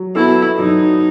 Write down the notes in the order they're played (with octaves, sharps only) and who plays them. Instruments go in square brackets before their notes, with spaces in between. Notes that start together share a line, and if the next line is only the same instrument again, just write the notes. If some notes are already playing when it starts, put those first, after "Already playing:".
Already playing: [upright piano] F#3
[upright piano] B3 F#4 A4 [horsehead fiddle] E4
[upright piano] F#3 [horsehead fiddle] D#4